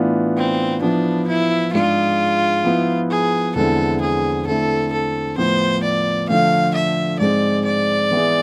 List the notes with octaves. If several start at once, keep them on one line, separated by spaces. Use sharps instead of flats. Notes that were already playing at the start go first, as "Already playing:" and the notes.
Already playing: A2 E3 B3 D4 F4
C4
F3 B3 D4 E4
E4
G#2 G#3 D4 F4 G#4
F3 B3 E4
G#4
E2 D3 G#3 C4 E4 A4
G#4
D3 A3 C4 E4 A4
A4
A2 F3 B3 C5
D5
D3 F3 A3 F5
E5
G#2 G#3 C4 D5
D5
E3 B3 E4 G#4